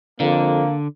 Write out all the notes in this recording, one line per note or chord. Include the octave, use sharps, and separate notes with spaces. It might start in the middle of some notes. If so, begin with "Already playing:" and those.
F2 D3 A#3